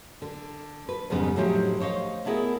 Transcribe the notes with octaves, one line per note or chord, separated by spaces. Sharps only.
D3
B4
F2 G#2 C#3 G3 B3 D#4
A2 D3 F3 F#3 D#4 G4
C5 C#5 D#5 F5
A3 B3 E4 G#4 A#4